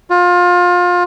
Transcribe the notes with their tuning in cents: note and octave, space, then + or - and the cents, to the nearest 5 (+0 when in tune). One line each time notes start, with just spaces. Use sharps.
F4 +25